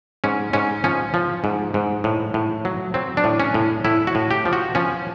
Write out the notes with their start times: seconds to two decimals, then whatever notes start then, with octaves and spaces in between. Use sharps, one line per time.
0.24 G#2 C#4
0.53 G#2 C#4
0.84 F3 C#4
1.14 F3
1.44 G#2
1.74 G#2
2.04 A2
2.34 A2
2.65 F#3
2.94 F#3 C4
3.17 D4
3.24 A2
3.40 C#4
3.54 A2
3.85 A2 E4
4.07 F#4
4.15 A2
4.31 G4
4.45 F3
4.53 F#4
4.75 F3 C#4